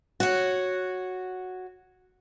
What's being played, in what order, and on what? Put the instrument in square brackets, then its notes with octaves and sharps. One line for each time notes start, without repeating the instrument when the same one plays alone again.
[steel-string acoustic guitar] F#4 C#5